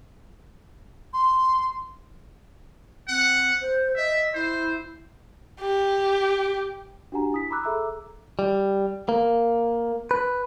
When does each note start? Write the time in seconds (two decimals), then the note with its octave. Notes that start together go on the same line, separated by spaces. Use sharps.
1.13 C6
3.08 C4 F#5
3.60 C5
3.96 D#5 E5
4.34 E4 C5
5.61 G4
7.12 D4 F#4 G4 F#5 G#5 A#5
7.32 E4 D#6 B6
7.50 A#5 B5 D6 E6 F#6
7.64 G#4 A4 E5 A#5 D6 E6
8.39 G3
9.09 A#3
10.11 B4